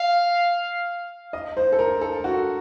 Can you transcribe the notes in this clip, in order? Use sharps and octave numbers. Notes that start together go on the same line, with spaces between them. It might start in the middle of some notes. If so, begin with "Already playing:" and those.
Already playing: F5
D#5
C5
A4
A#4
A4
F#4